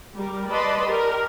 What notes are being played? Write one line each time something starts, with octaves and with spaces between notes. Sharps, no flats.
G3 A#4
B4 D5 D#5 A5 B5 C6
G4 A#4